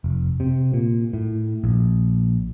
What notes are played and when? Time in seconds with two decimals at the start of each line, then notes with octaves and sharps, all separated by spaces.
0.04 F1
0.40 C3
0.73 A#2
1.13 A2
1.64 A#1